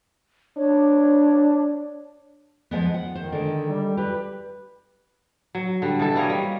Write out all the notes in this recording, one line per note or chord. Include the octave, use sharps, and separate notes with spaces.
D4 C#5
F3 G#3 B3
F#5
D#3 C5
D3 G#3
G3
G4 B4
F#3
D3 G3
B2 E3 A4
G3 A#3 C#5 D#5
G3